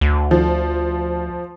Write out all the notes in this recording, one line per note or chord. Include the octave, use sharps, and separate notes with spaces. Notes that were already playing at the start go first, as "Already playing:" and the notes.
D2
F3